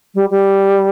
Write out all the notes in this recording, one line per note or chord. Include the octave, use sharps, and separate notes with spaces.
G3
G3